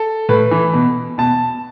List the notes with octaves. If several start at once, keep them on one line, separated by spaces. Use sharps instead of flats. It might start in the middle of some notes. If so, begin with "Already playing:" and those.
Already playing: A4
A2 B4
E3
B2
B2 A5